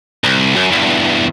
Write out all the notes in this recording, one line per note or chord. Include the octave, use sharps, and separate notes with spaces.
C2
F#2
E2 G2